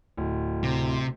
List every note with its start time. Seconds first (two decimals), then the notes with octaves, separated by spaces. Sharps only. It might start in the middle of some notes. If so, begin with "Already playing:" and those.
0.17 D1
0.63 C3